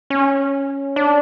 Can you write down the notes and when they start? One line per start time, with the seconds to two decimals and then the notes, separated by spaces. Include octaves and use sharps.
0.10 C#4
0.96 D4